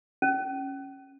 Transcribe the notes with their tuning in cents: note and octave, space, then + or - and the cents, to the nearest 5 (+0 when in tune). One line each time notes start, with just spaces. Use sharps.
C#4 -15